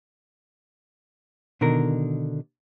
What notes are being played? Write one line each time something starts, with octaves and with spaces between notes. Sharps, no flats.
B2 D3 D#3 A#4